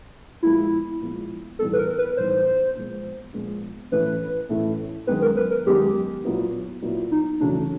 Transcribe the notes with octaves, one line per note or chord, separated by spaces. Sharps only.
A#2 F3 G#3 B3 E4
A#2 F3 G#3 B3
A2 E3 G3 B3 D#4 A4
B4
A#4
B4
A2 E3 G3 B3 D#4 C5
A#2 F3 G#3 B3
A#2 F3 G#3 B3
A2 E3 A3 C#4 E4 B4
A2 E3 A3 C#4 E4
F#2 D#3 G#3 B3 D#4 B4
A#4
B4
A#4
F#2 D#3 G#3 B3 D#4 G4
A#2 F#3 B3 E4
A#2 F#3 B3 E4
D#4
E2 C#3 F#3 A3 C#4 D4